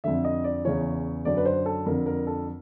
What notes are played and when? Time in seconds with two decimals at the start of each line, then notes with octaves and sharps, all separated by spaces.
0.04 F2 D3 E5
0.25 D#5
0.44 D5
0.65 E2 C#3 E3 C#5
1.25 F#2 D3 D5
1.37 B4
1.45 C5
1.66 A4
1.86 F2 D3 A#4
2.06 A#4
2.27 A4